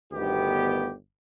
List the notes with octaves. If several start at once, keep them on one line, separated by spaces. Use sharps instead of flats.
G1 D2 D#3 B3 G4